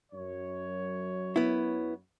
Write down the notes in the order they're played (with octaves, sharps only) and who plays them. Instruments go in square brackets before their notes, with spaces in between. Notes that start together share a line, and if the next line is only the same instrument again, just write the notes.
[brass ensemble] F#2 C#5
[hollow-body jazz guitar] B3 E4